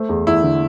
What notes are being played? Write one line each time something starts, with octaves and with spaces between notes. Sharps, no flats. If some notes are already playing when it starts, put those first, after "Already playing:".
Already playing: A3 C5
E2
E2 E4
D3